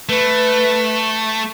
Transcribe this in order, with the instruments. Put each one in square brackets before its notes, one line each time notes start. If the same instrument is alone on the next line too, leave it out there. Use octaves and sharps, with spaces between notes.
[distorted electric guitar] A3 [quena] B4